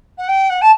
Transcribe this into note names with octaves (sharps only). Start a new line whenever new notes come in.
F#5
G5
F#5
A5